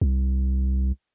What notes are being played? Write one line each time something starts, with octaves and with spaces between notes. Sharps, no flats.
C2